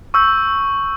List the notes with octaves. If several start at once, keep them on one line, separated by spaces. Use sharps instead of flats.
C#6 E6 G6